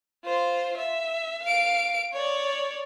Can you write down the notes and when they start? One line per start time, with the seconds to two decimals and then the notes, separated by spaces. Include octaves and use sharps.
0.25 F4 C5
0.78 E5
1.43 F5 D7
2.13 C#5 D5